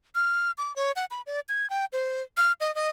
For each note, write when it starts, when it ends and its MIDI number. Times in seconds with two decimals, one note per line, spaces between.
0.15 0.51 89
0.58 0.75 86
0.76 0.92 73
0.96 1.05 78
1.11 1.22 83
1.26 1.40 74
1.49 1.69 92
1.70 1.85 79
1.93 2.22 72
2.37 2.52 89
2.61 2.74 75
2.75 2.89 75